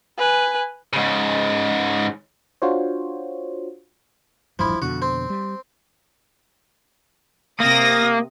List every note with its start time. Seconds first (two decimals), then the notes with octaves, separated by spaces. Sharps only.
0.18 B4 G#5
0.93 G#2 C#3
2.62 D4 F4 F#4 C5 C#5
4.59 D#1 A1 G2 F3 E4
4.82 F2 B2 D3 F#4
5.02 C4
5.30 G3
7.60 C3 A#3 D#6 A#6